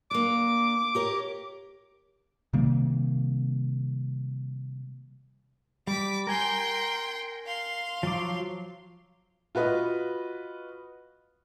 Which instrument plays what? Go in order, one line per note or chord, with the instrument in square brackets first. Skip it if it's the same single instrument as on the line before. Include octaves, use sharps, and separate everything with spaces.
[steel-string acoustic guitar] A#3 D4 [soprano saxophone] D6
[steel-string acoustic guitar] G4 A#4 C#5
[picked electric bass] C3 D#3 G3 A#3
[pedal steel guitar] G3 [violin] D6 B6
[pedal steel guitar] A#4 G#5 [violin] G5 C6
[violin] F5 C6
[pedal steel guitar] F3 F#3 D6
[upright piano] F4 F#4 B4 D#5